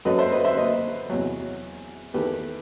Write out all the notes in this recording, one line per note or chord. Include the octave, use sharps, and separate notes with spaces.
F#2 F#3 A3 B4 D#5
C5 E5
B4 D#5
C5 E5
B4 D#5
E2 C3 F#3
E2 D#3 A3 G4 B4